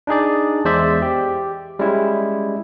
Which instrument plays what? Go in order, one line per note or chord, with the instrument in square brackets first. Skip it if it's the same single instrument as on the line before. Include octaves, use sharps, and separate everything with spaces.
[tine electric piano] D4 D#4 G#4 D5
E2 G#3 C5 D5 E5
G4
G3 G#3 C#4 E4